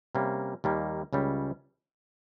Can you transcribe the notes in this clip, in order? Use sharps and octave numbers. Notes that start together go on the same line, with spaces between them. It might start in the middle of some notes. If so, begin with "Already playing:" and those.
C3 G3 A#3 C#4
D#2 D#3 G3 A#3
C#2 C#3 G3